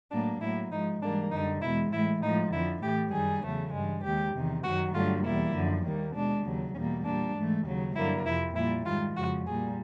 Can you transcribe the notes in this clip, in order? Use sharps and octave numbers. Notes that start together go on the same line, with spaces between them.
A2 F#3 A#3 D4
A2 F#3 A#3 E4
G#2 F3 G#3 D#4
G#2 E3 G3 A#3 D4
F#2 D3 G3 D#4
E2 B2 G#3 E4
A2 E3 G#3 E4
A2 F3 G#3 D#4
F2 D3 F3 E4
A2 E3 A3 G4
F#2 D#3 G3 G#4
E2 C#3 F#3 A3
G2 E3 G#3
D#2 D#3 G#3 G4
E2 C3 D#3
F#2 D#3 F#3 F#4
G2 D3 F#3 A3 F4
E2 B2 G3 A#3 E4
F#2 D3 F3
D#2 D#3 G3 A#3
B2 G#3 D4
D#2 C#3 F#3
E2 B2 G3 A#3 C#4
A#2 G3 A#3 D4
G#2 E3 A3
D#2 C#3 F#3
G2 D3 F#3 A#3 E4
F2 C3 F3 E4
A#2 G3 A#3 E4
G#2 D#3 G3 F4
F2 C#3 F3 G#3 F#4
A#2 G3 A#3 G#4